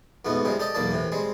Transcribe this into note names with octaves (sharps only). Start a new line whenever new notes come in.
F2 G#2 B2 A3 B3
C3 F3 G3 G#3
G4 A4 D5 D#5
B1 E2 A#3 D5 A5
A2 C3 E3
G3 G#3 C4